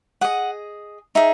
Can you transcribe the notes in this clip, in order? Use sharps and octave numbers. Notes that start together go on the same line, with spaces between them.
G#4 D#5 F#5
D#4 G#4 E5